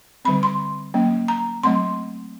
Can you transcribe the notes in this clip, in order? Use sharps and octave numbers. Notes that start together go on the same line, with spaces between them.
D3 G3 C4 B5
C6
F#3 A#3 C#4
A#5
F#3 A3 C4 C6